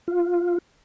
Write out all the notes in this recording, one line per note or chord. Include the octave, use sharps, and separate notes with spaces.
F4